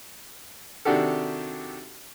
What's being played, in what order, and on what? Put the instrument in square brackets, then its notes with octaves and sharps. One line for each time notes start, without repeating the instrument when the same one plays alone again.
[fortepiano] C3 D#3 D4 F#4 G4 A4